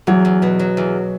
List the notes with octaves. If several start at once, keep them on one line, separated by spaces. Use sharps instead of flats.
E2 F#3
E2
B2
F#3
E2